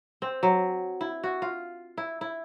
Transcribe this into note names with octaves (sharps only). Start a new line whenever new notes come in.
C4
F#3
E4
F#4
F4
E4
E4